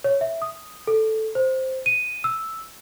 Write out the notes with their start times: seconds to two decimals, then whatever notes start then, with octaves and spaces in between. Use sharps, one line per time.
0.04 C#5
0.21 E5
0.42 D#6
0.87 A4
1.35 C5
1.86 D#7
2.24 E6